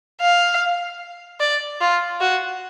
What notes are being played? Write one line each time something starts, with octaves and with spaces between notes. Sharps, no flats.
F5
D5
F4
F#4